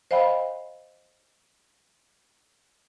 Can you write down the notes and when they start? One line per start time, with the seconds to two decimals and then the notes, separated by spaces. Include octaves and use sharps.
0.11 C5 D#5 F5 G5 B5